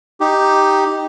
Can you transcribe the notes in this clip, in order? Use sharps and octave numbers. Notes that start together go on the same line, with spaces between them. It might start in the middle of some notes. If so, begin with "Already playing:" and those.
D#4 G4